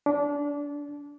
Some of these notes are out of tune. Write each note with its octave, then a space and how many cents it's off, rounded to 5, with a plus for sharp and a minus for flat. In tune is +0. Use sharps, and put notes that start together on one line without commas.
D4 -25